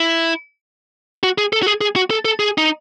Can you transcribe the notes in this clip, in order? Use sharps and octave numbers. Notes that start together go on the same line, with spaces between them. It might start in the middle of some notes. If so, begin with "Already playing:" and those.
Already playing: E4
F#4
G#4
A4
F#4
G#4
G#4
F#4
A4
A4
G#4
D#4